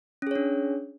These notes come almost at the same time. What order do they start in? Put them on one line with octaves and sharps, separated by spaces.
C#4 G#4 C#5 D4